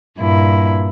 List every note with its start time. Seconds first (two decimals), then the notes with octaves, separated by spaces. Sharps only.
0.18 G2 A#2 E4